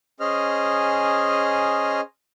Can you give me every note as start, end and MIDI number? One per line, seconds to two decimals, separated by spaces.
0.20 2.00 61
0.20 2.00 68
0.20 2.00 72
0.20 2.00 75
0.20 2.00 89